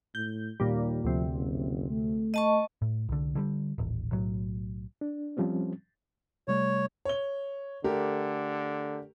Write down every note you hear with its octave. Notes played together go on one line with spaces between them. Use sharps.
A2 G6
D#2 A#2 G3
D2 C3 F3
F#1
A3
D#5 A5 C#6
A2
C2 D3
D3 E3 G3
D#1 A1
B1 A2 F#3
D4
F3 G3 C4 C#4
C3 G3 A3 C#5
C#5 G7
D3 A3 G4 A#4